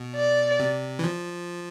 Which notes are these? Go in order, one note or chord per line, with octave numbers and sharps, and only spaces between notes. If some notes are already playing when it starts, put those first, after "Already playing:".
Already playing: B2
D5
C3
E3
F3